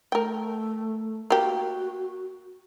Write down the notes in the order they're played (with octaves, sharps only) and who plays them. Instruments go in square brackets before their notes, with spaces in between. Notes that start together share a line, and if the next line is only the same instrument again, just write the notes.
[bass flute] A3 [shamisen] A#4 G5
[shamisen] A#3 G4 [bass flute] F#4